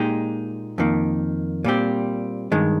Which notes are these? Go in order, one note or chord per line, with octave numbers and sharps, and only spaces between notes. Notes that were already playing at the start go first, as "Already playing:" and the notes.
Already playing: A#2 G#3 D#4 G4
F2 D#3 A#3
A#2 G3 C4 G4
G2 D#3 G#3